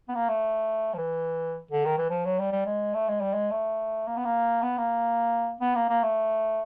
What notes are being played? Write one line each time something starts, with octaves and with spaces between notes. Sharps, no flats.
B3
A#3
A3
F3
E3
D3
D#3
E3
F3
F#3
G3
G3
G#3
A3
G#3
G3
G#3
A3
A#3
B3
A#3
B3
A#3
B3
A#3
A#3
A3